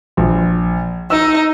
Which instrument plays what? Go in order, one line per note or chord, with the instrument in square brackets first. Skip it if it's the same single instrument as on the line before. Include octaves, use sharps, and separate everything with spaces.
[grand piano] A#1
[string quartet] D#4 [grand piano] E6